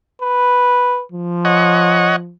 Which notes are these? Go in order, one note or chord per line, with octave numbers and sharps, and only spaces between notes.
B4
F3
C#5 D#5 F#5